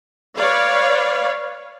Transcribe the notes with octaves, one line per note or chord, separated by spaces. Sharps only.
B4 C#5 D5 F5